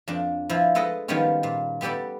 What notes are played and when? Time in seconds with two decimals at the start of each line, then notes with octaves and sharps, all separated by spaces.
0.08 F2 D4
0.49 F3 E4
0.75 G#3 A4 B4 D#5 F#5
1.08 D#3 F3 G3 G#3 B3 C#4
1.43 A#2
1.81 G3 B3 G4 A4 D5